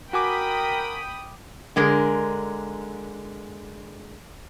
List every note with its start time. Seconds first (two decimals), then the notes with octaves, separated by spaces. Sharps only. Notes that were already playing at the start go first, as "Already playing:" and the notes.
0.13 F#4 A#4 G5 G#5 B5 D6 D#6
1.76 D3 G#3 A#4